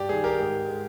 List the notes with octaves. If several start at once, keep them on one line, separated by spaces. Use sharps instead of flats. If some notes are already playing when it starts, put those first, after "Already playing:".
Already playing: G2 G4 D5
D#3 G3 G#4
G4 A#4
G#2
G#3